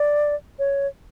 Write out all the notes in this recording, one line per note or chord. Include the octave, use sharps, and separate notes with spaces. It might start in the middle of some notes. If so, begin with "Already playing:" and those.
Already playing: D5
C#5